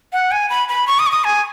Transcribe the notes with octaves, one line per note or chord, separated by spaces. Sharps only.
F#5
G#5
B5
B5
C#6
D#6
C#6
D#6
G#5